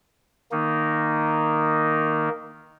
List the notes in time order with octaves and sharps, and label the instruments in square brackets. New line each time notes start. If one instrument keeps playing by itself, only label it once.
[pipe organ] D#3 A#3 D#4